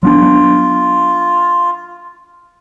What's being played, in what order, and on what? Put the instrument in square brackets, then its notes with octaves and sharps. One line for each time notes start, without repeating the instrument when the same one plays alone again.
[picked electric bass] F#3 B3 D4 [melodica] F4